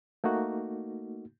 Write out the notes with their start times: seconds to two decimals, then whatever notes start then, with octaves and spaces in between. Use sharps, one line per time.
0.24 A3 A#3 D#4 F#4